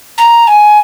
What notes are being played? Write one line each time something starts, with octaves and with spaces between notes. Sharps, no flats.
A#5
G#5